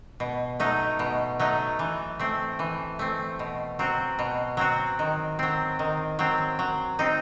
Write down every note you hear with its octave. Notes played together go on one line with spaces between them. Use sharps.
B2
F#3 A3 D#4
B2
F#3 A3 D#4
E3
A3 C4
E3
A3 C4
B2
F#3 C4 F#4
B2
F#3 C4 F#4
D#3
F#3 C4
D#3
F#3 C4
F#3
C4 D#4